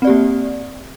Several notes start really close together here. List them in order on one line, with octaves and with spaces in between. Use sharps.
C4 D5 G4 A#3